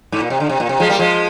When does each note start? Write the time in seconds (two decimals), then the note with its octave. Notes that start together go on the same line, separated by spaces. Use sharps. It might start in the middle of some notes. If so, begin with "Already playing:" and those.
0.12 G#2
0.20 A#2
0.30 C3
0.40 D3
0.49 C3
0.60 A#2
0.69 C3
0.80 F3 G#3
0.89 G3 A#3
0.99 F3 G#3